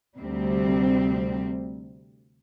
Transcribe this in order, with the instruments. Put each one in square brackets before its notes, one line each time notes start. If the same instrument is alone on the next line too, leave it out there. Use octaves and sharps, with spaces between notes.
[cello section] D2 C3 G3 C4